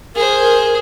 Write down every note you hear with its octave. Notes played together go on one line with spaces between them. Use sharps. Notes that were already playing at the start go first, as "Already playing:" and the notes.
G#4 A#4 C5